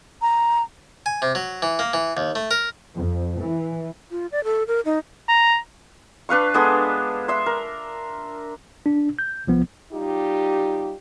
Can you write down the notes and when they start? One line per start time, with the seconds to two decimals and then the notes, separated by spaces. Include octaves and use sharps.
0.22 A#5
1.06 G#5
1.22 C3
1.35 F#3
1.62 E3
1.79 A#3
1.93 E3
2.17 D#2
2.35 A3
2.51 A#4
2.96 F2
3.40 E3
4.11 F4
4.32 D5
4.44 A4
4.68 A#4
4.85 D#4
5.29 A#5
6.29 D4 B4 F5 C#6
6.54 G#3 B3 D4 A4
7.28 E5 C6
7.46 A#4
8.86 D4
9.19 G6
9.47 C2 F3 B3
9.93 G3 D#4 F4 G4